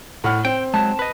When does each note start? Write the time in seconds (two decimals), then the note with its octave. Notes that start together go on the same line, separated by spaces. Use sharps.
0.24 A2 F#5 F6
0.45 C4 G5
0.74 F#3 G#3 A5
0.99 B4 D#5